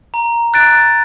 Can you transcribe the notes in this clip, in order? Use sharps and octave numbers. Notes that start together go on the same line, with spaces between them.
A#5
F#6 A6 D7